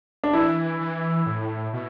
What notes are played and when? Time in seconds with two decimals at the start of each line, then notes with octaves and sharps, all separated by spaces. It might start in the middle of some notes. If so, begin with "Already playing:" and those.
0.24 D4
0.33 E3 E4
0.80 E3
1.26 A2
1.73 B2